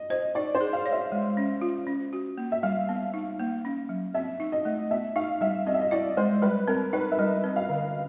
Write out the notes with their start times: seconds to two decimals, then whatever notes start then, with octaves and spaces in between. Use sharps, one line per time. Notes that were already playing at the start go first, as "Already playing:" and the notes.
Already playing: D#5
0.10 C5 D#5
0.35 D#4 D5
0.55 C5
0.61 G#4
0.73 F5
0.86 C#5
0.92 E5
1.12 G#3
1.37 C#4
1.62 F4
1.87 C#4
2.13 F#4
2.38 A#3
2.52 E5
2.63 G3 F5
2.89 B3
3.14 D#4
3.40 A#3
3.65 C#4
3.89 F#3
4.14 C4 E5
4.40 D#4
4.52 D#5
4.65 A3
4.91 B3 E5
5.16 D#4 F5
5.41 G3 E5
5.67 C4 D#5
5.74 E5
5.81 D#5
5.91 E4 D5
6.17 G#3 C5
6.42 G3 B4
6.68 C4 A#4
6.93 D#4 B4
7.12 E5
7.18 G3 D#5
7.44 C4
7.56 F5
7.69 D3